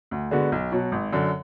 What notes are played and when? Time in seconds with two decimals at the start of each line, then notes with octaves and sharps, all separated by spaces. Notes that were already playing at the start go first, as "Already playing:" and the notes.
0.11 D2
0.31 D3 G#3 B3 F#4
0.52 B1
0.72 B2 F#3
0.92 G#1
1.12 F#2 D3